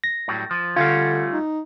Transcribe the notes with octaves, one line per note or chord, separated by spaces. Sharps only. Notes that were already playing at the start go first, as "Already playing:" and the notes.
A#6
A2 F#3 G3
F3
D3 G3 A3 C#4 F4 F5
D#4